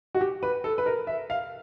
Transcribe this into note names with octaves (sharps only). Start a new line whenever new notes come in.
F#4
G4
B4
A4
B4
A#4
E5
F5